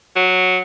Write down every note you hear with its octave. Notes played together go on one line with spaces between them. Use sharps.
F#3